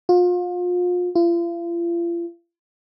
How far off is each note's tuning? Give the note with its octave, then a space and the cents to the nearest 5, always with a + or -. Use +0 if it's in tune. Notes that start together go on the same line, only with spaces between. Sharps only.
F4 +35
F4 -40